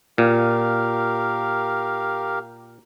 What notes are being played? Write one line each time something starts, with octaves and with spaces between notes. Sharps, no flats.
A#2 G4 A#4 F5